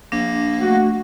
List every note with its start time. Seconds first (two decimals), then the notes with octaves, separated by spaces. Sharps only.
0.12 A#1 A#3 D4 A#6
0.61 A3 F#4